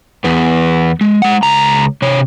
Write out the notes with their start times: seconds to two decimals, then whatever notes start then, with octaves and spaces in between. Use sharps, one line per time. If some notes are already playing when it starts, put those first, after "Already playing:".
0.24 E2 B3
1.01 G#3
1.22 G#3 F#5
1.43 C#2 A#5
2.02 C3 C#5